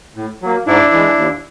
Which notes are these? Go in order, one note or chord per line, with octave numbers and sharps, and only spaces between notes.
A2
F#3 A#3
G#2 D4 E4
E3 G#3
D#2